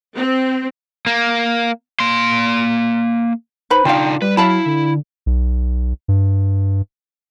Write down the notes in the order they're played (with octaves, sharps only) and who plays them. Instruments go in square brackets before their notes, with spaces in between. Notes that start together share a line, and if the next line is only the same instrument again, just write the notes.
[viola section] C4
[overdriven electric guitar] A#3
A#3 C6
[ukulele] D#4 B4 B5 [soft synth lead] C5
[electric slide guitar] C#3 D4 D#4 [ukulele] F4 F5 [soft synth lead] G5
[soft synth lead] G3 [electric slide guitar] B4
[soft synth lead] F#3 [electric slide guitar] E4 [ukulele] F5 A5 B5
[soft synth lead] D3
[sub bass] B1
G2